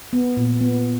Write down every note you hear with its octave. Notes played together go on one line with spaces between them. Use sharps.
B3
A#2
B3